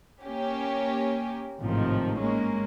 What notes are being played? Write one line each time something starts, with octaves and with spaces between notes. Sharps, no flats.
A#3 C#4 G4
A1 G#2 C3 D#3 F3
G#3 A#3 C#4